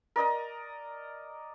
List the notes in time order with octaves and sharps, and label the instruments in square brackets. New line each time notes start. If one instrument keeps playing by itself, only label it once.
[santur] A#4 D5 D#5 A#5